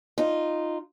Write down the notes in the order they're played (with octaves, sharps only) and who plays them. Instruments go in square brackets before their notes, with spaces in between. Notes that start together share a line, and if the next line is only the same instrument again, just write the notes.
[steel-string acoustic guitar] D#4 F4